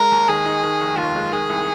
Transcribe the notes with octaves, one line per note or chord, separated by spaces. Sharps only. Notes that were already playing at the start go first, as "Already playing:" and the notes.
Already playing: G#3 A#4
D#2
D#3 G#4
D#4
D#3
F1
D#2 F4
G#3
D#3 G#4
C2